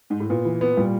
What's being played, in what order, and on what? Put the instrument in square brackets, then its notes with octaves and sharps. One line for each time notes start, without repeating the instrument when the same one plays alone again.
[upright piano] G#2
A2
[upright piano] A#2 [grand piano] B3
[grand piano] E3
B3
[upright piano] A#2 [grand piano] G3